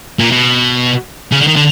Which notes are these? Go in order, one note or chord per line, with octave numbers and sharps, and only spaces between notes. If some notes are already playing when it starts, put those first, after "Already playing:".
A#2
B2
C#3
D3
D#3
D3